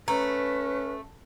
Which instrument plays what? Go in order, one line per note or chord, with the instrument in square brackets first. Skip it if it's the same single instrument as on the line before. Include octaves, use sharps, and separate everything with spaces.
[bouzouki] A3 [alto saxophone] C#4 [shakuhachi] B4 [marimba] A#5